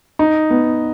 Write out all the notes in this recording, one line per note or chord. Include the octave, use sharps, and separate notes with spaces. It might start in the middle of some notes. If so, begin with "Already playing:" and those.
D#4
B3